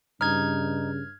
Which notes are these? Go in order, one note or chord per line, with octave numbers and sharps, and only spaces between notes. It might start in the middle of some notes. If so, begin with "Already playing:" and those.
G2 C#3 D#4 F6 G#6